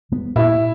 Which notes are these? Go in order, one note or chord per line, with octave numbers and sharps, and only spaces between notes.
G3 B3
A#2 E4